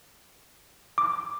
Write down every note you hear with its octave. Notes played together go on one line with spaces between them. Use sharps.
D6